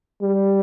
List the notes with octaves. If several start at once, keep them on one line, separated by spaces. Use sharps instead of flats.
G3